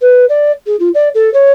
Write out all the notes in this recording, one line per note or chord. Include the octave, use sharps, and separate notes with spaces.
B4
D5
G#4
F4
D5
A4
C#5